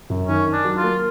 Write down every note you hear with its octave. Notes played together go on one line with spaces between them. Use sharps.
F#2
D#3 C#4
D#3
D4
F#3
F4
A#3